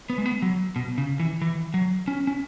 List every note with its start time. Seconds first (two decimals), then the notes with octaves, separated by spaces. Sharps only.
0.10 B3
0.18 G#3
0.26 B3
0.42 F#3
0.76 B2
0.98 C#3
1.20 E3
1.42 E3
1.74 F#3
2.08 C#4
2.27 C#4